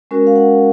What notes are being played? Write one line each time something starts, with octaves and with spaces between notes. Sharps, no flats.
G#3 C#4 F#4 A#4
F5
F#5